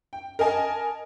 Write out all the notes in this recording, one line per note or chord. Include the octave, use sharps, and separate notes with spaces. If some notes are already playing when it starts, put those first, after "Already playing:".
G5
A#4 D#5 G#5 A5